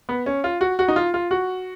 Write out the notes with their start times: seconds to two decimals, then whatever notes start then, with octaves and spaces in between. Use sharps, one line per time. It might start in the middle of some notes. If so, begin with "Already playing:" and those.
0.09 B3
0.26 C#4
0.44 F4
0.61 F#4
0.79 F#4
0.88 D#4
0.96 F4
1.14 F4
1.31 F#4